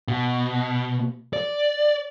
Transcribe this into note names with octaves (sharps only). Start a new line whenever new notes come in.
B2
D5